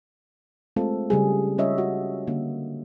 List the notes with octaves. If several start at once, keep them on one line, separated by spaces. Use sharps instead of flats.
G#3 A3 C4 F4 A4
C#3 G3 G#4
G3 C#4 F4 C#5 D#5 E5
F#4
D3 A#3